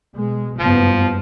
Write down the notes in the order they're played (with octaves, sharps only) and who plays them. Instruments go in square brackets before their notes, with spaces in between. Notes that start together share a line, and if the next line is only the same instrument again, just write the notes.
[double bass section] B2 G#3
[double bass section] F#1 G2 B3 [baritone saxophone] F3